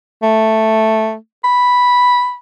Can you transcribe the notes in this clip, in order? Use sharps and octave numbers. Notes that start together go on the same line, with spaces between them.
A3
B5